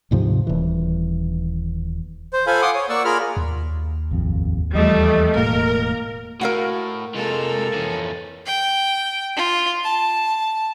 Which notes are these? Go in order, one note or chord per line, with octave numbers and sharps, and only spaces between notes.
D2 G#2 C3 F3
D#1 E3
C5
F4 A4 C5 F5 G#5 B5
F#5 C6 D6 D#6
C#5
A#3 D5 F#5 C#6 E6
F4 G#4 A#4 B5 F6
D#2
G#1 F2
E2 F3 G3 A3 D#5
E1 A2 A#3 A#4
A2 F#4 A#4 F5 F#5
C3 G#3 A#3 F4 A4
F2 E3 C#4
G5
F4
A5